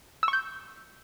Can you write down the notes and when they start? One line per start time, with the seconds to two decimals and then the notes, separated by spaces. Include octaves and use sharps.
0.23 E6
0.28 C#6
0.33 G6